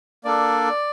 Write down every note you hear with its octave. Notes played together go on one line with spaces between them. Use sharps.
A#3 D4 A4 D5